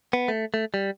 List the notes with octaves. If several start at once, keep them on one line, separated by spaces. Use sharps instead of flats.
B3
A3
A3
G3